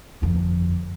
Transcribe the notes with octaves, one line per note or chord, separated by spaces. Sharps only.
G1 F2